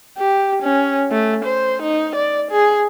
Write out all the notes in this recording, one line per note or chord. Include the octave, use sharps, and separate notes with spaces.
G4
C#4
A3
C5
D#4
D5
G#4